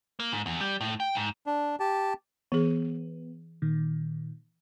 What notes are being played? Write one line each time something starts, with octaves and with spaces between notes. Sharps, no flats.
A#3
G#2
E2
G3
A2
G5
G#2
D4
G4 A5
E3 B3 G#4
A#2 D#3